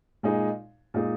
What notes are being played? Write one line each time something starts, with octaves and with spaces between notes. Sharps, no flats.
A#2 G#3 D#4 G#4
A#2 G#3 D#4 G#4